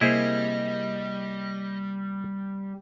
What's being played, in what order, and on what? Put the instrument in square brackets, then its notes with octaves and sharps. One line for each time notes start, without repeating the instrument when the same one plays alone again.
[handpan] C3 A#3 [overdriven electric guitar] G3 [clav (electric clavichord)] E4 G#4 C5 [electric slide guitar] D#5